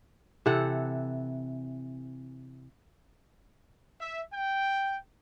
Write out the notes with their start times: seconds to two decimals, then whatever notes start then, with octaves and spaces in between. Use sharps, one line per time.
0.46 C3 E3 A4 F#5
4.00 E5
4.32 G5